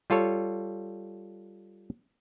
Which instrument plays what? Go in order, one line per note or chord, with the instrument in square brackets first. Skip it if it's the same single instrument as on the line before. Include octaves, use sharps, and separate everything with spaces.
[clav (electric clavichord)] G3 F4 A4 C#5